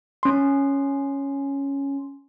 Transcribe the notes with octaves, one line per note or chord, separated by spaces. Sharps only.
C#4 C6